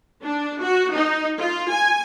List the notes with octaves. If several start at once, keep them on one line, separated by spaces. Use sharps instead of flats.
D4
F#4
D#4
F4
G#5